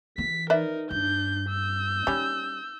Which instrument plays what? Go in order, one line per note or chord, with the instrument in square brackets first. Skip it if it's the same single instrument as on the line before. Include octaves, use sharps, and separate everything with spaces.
[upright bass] E3 [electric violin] B6
[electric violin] D#4 A#4 [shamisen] B4 D5 E5
[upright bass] G2 [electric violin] D4 G6
[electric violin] E6 G6
[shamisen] G3 C#4 [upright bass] D#4